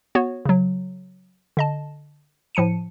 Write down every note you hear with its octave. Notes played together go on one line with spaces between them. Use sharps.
B3 F#4 C#5
C#3 F#3
D3 D#5 A5
A2 F3 A5 C#7 D#7